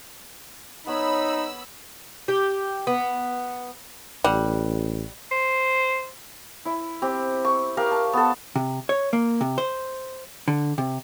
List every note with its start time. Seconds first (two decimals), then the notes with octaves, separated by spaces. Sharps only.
0.87 B3 D#4 C#5 B5 E6
2.28 G4
2.87 B3
4.24 A1 G3 F#5
5.31 C5
6.65 E4
7.02 C4 G4
7.45 C#6
7.77 G4 A#4 F5
7.91 A5
8.13 B3 A4
8.56 C3
8.89 C#5
9.13 A#3
9.41 C3
9.58 C5
10.48 D3
10.78 C3